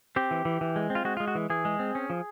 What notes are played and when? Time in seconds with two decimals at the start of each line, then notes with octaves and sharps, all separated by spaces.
0.16 C4 G4
0.31 E3
0.45 E3
0.61 E3
0.76 G#3
0.90 C4
0.95 F4
1.05 G#3 F#4
1.17 F4
1.20 G#3
1.28 F#4
1.35 E3
1.50 E3 G#4
1.65 G#3
1.79 C4
1.95 C#4
2.10 F3